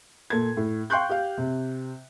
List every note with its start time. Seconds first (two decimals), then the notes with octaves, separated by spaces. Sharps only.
0.30 A#2 A4 G#6
0.57 A2
0.90 F5 G5 C6 C#6 F#6 G6
1.09 G4 F5
1.38 C3